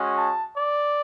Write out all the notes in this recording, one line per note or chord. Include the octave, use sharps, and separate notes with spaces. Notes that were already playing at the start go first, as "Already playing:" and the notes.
Already playing: G#3 C#4 F#4
A5
D5